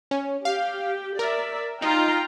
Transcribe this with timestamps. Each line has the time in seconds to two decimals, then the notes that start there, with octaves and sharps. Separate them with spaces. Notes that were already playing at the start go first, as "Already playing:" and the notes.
0.11 C#4
0.45 G4 F5
1.19 A#4 D5 E5
1.82 D#4 F4 G5 A#5